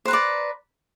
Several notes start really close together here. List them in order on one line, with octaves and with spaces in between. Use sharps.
C5 B4 A#5 D5